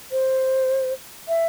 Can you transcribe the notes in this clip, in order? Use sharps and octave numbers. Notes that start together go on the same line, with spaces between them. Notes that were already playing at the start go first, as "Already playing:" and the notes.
C5
E5